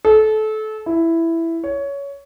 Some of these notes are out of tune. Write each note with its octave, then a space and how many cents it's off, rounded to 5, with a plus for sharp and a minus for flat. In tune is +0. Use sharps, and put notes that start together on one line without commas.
A4 -25
E4 +5
C#5 +15